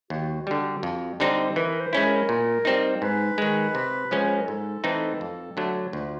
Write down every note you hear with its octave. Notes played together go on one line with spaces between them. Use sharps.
D#2 F#4
D3 G3
F2
D3 G3 C4 D#4
E3 A#4
C5
G#3 C#4 E4
A#4
A#2
G3 C4 D#4
G#2 B4
D#3 G#3
C3
F3 G#3 C#4
C5
B4
A#4
G#2 A4
E3 A3 C4 D#4
F2
D3 F#3 A3
D2 F4